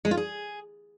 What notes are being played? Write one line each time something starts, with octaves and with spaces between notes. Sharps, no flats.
G#3
F4
G#4